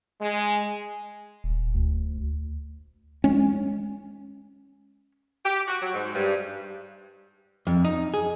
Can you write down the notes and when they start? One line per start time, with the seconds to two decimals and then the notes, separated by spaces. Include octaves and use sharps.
0.21 G#3
1.44 D#1
1.74 D2
3.24 G#3 C#4
5.45 G4
5.67 F#4
5.81 F#3
5.94 G#2
6.15 G2
7.67 F2
7.85 D#4
8.14 G#4